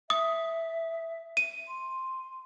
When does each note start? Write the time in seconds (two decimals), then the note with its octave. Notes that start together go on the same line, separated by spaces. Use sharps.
0.10 E5 D#6
1.37 D#7
1.68 C6